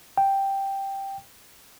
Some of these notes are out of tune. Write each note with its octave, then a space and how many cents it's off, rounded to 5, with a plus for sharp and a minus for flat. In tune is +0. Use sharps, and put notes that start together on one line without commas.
G5 +0